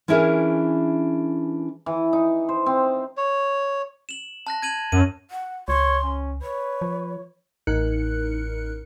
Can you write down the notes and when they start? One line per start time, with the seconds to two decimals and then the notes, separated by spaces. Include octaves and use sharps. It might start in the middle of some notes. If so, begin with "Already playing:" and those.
0.08 E3 C#4 D4 E4 G#4 A#4
1.86 E3
2.13 D#4
2.49 C5
2.66 C4
3.17 C#5
4.09 E7 F#7
4.47 A5 F#6 A#6
4.62 G#6 D#7 F#7
4.92 F#2 D#7
5.31 F#5
5.68 C#2 C#5 C6
6.03 C#4
6.42 B4 C#5
6.81 F3
7.67 A1 A2 D#4 A#4 F#6 C#7